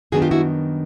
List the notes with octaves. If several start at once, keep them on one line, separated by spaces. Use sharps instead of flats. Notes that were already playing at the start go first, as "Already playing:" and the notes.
F#2 D#3 G3 B3 D4 F#4 G#4
F4 G4
E4 F#4